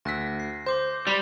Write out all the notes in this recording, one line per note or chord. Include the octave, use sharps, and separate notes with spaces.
D2 E6 F#6 A#6 B6
C7
C5 C6 D6 G6
G3 C6 B6